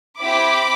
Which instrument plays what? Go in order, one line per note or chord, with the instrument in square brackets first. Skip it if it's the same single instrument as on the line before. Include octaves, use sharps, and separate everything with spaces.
[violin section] C4 E4 G4 B5 D6